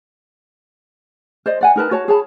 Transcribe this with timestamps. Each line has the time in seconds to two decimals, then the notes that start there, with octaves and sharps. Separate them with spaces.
1.46 C5 D5 D#5
1.61 D5 F#5 G#5
1.76 D#4 A#4 B4 A5
1.91 F#4 C#5 A5
2.08 G#4 C#5 A5 B5